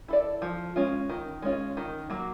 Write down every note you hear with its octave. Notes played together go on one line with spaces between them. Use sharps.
E4 A4 D5
F3
G#3 C#4 F4
D#3
G#3 C#4 F4
D#3
F#3 A#3